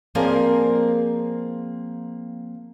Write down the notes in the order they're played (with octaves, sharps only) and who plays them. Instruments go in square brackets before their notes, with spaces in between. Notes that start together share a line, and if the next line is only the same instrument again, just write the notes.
[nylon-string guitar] F3 A#3 C4 G#4 A#4 D5